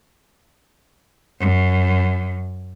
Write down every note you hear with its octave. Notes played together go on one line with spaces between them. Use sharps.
F#2